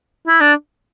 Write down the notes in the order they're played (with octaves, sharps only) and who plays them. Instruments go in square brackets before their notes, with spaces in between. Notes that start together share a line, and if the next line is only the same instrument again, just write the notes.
[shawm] E4
D4